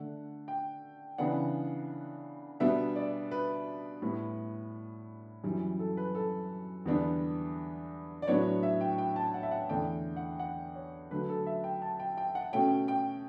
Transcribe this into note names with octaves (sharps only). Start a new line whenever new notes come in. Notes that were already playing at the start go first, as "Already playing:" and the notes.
Already playing: D3 A3 D4 F#5
G5
C#3 E3 B3 D4 F#5
B2 G3 B3 D4 E5
D5
B4
A2 G3 B3
F#2 E3 G3
A4
B4
A4
E2 D3 G3 B3 D4
D5
A2 F#3 B3 D4 C#5
E5
G5
G5
A5
F#5
E5
F#5
E2 D3 A3 D4 G5
F#5
F#5
C#5
D3 F#3 A3 B4
A4
E5
G5
A5
G5
G5
F#5
B2 A3 C#4 G5
G5